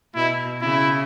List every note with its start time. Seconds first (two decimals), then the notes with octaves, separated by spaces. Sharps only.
0.15 B2 E4
0.62 C#3 E4